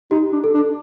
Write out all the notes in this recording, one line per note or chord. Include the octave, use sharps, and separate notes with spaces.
D#4 G4
D4
A4
D4